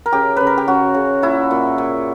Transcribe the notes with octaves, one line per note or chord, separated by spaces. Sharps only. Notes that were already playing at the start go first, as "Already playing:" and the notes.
A#4
C#3 G4
C#3 B4
A#4
G4
C#3 F#4
C#3
A#2 E4
A#2
A#2